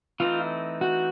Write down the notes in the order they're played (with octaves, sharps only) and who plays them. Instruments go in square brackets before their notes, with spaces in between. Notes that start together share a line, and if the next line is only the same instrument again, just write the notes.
[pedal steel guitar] E3 A3 C4 D#4 [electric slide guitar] F4
[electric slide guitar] F#4